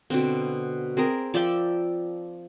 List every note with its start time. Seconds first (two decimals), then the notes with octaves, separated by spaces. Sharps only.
0.10 B2 D3 C4
0.97 C4 G#4 A#4
1.34 F3 D5 E5 G5